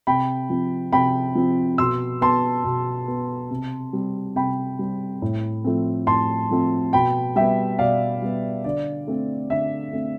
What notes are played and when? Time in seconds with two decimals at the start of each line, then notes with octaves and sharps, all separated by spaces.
0.07 C3 G5 B5
0.50 F3 C4
0.93 C3 G5 B5
1.35 F3 C4
1.78 B2 C6 E6
2.21 B3 A5 C6
2.64 B2
3.08 B3
3.51 C3
3.93 G3 C4
4.36 C3 G5 B5
4.79 G3 C4
5.22 A2
5.64 F3 A3 C4
6.07 A2 A5 C6
6.51 F3 A3 C4
6.93 B2 G5 B5
7.36 G3 B3 E5 G5
7.78 B2 D5 F5
8.22 G3 B3
8.64 D3 D5
9.07 A3 C4
9.50 D3 E5
9.93 A3 C4